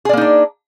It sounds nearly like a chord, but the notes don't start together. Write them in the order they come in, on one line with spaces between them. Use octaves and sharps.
G#4 D5 A#3 D#4 D4